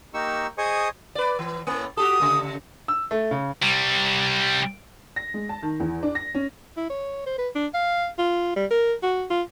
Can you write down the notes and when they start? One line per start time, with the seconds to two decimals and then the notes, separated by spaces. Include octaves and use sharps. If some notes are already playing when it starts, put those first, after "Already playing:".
0.14 A#3 D#4 G4 C#6 E6
0.58 G#4 C5 D#5 C#6 D#6
1.15 B4 D5
1.39 E3
1.67 A2 A#3
1.97 F#4 G4 A4 D#6
2.20 C#3 A3
2.88 E6
3.11 A3
3.31 C#3
3.62 C3 G3
5.16 A#6
5.34 G#3
5.49 A5
5.62 D#3
5.80 E2
6.03 D4
6.15 A#6
6.35 C#4
6.77 E4
6.90 C#5
7.26 C5
7.38 B4
7.56 D4
7.74 F5
8.19 F4
8.56 G3
8.71 A#4
9.03 F#4
9.30 F4